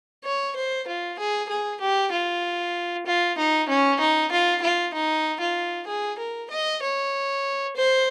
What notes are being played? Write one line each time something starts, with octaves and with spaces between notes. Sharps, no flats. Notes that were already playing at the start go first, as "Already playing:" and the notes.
C#5
C5
F4
G#4
G#4
G4
F4
F4
D#4
C#4
D#4
F4
F4
D#4
F4
G#4
A#4
D#5
C#5
C5